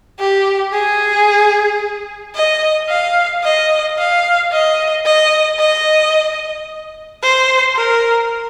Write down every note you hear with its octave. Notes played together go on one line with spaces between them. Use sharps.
G4
G#4
D#5
F5
D#5
F5
D#5
D#5
D#5
C5
A#4